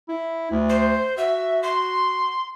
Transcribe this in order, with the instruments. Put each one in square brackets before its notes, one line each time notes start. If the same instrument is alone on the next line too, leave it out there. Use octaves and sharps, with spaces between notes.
[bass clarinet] E4
D2
[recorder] C5
[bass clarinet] F#4 [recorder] E5
[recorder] C6